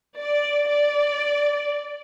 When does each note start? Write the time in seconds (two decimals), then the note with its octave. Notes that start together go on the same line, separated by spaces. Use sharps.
0.17 D5
0.68 D5